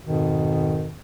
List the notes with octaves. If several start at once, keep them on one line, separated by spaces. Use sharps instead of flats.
F2 G#2 B2 D#3